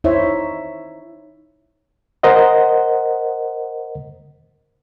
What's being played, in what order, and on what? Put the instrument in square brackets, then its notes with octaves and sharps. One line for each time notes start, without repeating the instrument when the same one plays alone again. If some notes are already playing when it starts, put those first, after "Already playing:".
[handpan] D#4 E4 C5 C#5 E5
[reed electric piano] A#4 C5 D#5 F#5